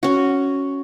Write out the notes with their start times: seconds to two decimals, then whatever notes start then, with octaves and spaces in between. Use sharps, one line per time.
0.03 C#4 F#4